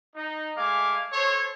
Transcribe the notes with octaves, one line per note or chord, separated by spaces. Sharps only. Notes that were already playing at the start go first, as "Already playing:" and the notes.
D#4
G#3 A3 F5 G#5 D6
A4 C5 C#5